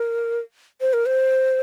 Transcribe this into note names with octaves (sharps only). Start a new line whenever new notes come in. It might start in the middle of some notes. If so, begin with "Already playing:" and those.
Already playing: A#4
C5
A#4
C5